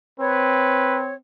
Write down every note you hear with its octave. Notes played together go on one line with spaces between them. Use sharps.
C4 B4 C#5